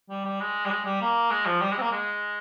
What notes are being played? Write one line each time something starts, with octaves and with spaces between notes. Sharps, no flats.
G3
G3
G#3
G3
G#3
G3
A#3
G#3
F3
G3
G#3
C4
A#3
G#3